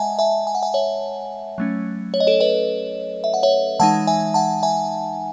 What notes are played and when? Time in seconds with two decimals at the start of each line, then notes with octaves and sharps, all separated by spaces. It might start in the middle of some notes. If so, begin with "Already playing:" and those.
Already playing: G#3 D#5 E5 F#5 G#5 A5
0.19 E5 G#5
0.47 G#5
0.55 F#5
0.62 E5 G#5
0.74 C#5 E5
1.58 F#3 A3 C#4
2.14 C#5
2.20 D#5
2.27 A4 C#5
2.40 B4 D#5
3.24 E5
3.34 F#5
3.43 C#5 E5
3.80 E3 G#3 D#4 F#5 A5
4.07 E5 G#5
4.34 F#5 A5
4.63 E5 G#5